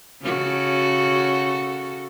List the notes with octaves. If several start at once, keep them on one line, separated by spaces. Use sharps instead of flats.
C#3 F#4 A4